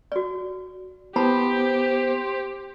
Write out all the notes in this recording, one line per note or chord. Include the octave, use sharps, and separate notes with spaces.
F#4 D5
B3 E4 G4 C5 A5 B5